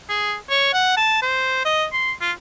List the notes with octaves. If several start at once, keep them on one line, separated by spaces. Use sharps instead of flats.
G#4
C#5
F#5
A5
C5
D#5
C6
F4